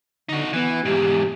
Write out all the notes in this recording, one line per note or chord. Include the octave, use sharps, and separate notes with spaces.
D3 D#4 F#4
E3 B3
E2 G#2 G4